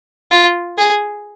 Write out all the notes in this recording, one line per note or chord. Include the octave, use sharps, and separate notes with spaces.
F4
G#4